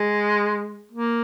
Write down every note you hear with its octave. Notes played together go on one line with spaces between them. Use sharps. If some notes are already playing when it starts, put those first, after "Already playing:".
Already playing: G#3
A#3